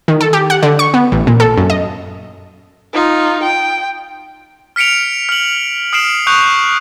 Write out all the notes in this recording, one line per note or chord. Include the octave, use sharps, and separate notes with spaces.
D#3
A4
G4
F#5
D3
C#6
B3
A1
A#2
A4
F#2
D#5
D#4 F4
G5
F6 B6 C#7 D7 F7
F6 F#7
D#6 F6 C7 D7 E7 F#7
C#6 D#6 F#6 G6 F7